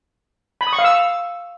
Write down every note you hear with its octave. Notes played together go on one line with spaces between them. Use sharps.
B5
D#6
C#6
F5
E6